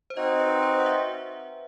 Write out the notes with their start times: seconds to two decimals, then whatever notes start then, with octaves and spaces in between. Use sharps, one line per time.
0.10 C5
0.17 C4 D#4 F#4 D#5
0.40 B4
0.63 C5
0.80 F#5
0.86 E5